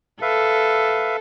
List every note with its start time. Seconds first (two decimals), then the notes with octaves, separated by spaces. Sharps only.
0.22 A4 B4 E5 F5